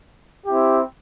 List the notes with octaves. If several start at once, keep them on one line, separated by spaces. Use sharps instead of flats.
C4 E4 G4